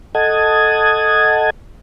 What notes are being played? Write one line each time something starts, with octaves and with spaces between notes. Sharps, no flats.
A4 D#5 F#5 A5 D#6 G#6